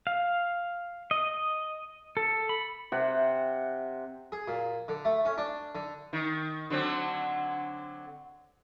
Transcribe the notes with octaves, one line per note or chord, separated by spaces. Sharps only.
F5
D#5
A4
B5
C3 C5 F#5 G5
G#4
A#2
D3
A3
C#4
D4
D3
D#3
D3 F#3 C4